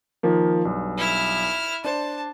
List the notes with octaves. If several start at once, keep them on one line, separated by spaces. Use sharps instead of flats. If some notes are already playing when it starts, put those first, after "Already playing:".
D#3 F3 A#3
B1 G2
E4 F6
D4 C5 A5